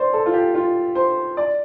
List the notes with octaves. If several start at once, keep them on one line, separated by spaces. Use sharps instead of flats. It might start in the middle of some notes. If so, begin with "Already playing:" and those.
Already playing: C5 D5
A4
F4
G4
F4
C5
D5